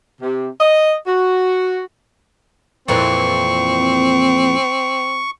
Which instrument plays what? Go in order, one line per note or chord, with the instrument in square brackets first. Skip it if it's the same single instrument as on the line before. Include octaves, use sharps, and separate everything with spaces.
[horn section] C3
D#5
F#4
[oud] F2 A#2 E3 [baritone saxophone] C4 [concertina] C#6